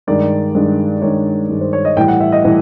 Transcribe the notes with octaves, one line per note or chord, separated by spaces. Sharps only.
G2 D#3 G#3 D5
G2 D#3 G#3
G2 D#3 G#3 C#5
G2 D#3 G#3
C5
C#5
D#5
A2 E3 G3 G5
F#5
E5
D#5
A2 E3 G3